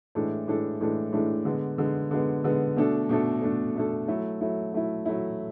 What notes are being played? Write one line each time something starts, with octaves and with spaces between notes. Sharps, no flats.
A2 E3 G#3 D4 A4
A2 E3 G#3 D4 A4
A2 E3 G#3 D4 A4
A2 E3 G#3 D4 A4
D3 G#3 B3
D3 G#3 B3
D3 G#3 B3
D3 G#3 B3
B2 A3 D4 A4
B2 A3 D4 A4
B2 A3 D4 A4
B2 A3 D4 A4
F#3 A3 E4
F#3 A3 E4
F#3 A3 E4
F#3 A3 E4